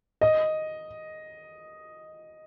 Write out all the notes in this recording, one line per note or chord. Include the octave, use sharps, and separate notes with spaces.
D#5